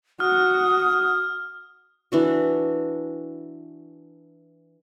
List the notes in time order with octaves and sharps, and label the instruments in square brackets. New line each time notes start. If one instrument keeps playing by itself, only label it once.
[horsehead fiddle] F#4 [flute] D#6 [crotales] F6
[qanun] E3 D4 F#4